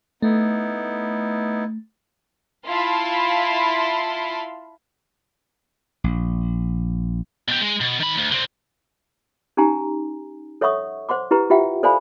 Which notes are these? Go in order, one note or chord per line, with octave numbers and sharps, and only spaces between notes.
A3 B3 D#4 E4
E4 F4 F5 A5 B5 C6
A#1
B2 G4
G#3
B2
D#3 B5
D2
D3 C4
C#4 D#4 G4 G#5 A#5
A4 C#5 E5 F#5 C#6 D#6
C5 F#5 C6 D6
E4 G4 B4 A#5
F4 G4 E5 F#5 G5
A4 C5 D5 F5 G#5 B5